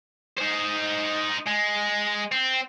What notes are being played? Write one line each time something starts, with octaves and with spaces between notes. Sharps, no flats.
D#4 C5
G#3
C4